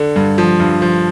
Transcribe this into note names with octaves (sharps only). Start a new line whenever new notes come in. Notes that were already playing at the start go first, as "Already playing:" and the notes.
Already playing: D3
G2
F3
G2
F3